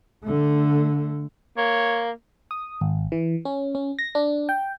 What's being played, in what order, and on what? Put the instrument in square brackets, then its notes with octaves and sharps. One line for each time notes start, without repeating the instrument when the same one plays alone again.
[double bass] D3 A3
[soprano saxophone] A#3 [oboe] C#5
[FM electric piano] D#6
G#1
E3
C#4
C#4
A#6
D4
G5